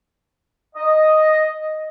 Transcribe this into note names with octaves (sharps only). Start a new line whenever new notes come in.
D#5